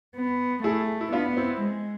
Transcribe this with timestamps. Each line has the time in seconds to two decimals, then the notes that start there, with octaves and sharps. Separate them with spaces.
0.16 B3
0.63 A3 E4 G#4
1.01 E4
1.12 B3 D4 F4
1.37 C4 E4
1.61 G#3